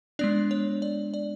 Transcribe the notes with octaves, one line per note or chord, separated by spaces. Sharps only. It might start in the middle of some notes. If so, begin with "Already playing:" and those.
G#3 B3 D4 D5
C#5
D5
D5